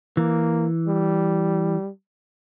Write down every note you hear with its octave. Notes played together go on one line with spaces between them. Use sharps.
E3 A#3
G3